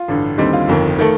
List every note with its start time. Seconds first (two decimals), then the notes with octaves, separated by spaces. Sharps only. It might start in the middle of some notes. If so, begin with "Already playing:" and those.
Already playing: F4
0.08 A1 G2 D3
0.38 D#2 D3 G3 C4 D#4
0.53 F4
0.68 G1 F2 D#3
0.98 D#3 A3